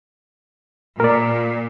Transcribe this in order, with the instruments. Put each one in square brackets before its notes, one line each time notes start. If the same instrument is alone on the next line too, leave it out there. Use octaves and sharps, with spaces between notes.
[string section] A#2 [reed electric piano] A#4 D5